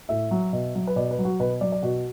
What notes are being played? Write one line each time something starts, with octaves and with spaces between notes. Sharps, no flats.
A2 E5
F#3
B2
F#3
B4
B2 D5
B4
F#3
F#4
B2 B4
F#3 D5
D5
B2 F#4